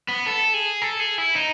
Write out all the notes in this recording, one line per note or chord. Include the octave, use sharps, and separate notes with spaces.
B3
A4
G#4
A4
G#4
E4
D#4